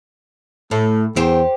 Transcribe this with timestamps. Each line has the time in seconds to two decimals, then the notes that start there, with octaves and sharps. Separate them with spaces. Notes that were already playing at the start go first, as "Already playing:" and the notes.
0.71 A2 A3
1.16 E2 G4 C5